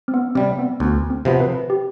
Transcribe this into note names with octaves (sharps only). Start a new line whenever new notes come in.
C4
B3
C3 G3 C4
B3
D2 B3
C4
C3 F3 B3
B4
G4